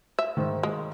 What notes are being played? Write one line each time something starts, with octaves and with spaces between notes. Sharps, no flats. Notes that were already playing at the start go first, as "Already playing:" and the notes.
E5
G#2 D#3
G#3